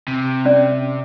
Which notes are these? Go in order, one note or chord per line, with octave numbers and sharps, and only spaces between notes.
C3
C#4 D5